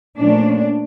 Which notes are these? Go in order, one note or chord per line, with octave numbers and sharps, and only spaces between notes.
A#2 F3 A3 C#4 D4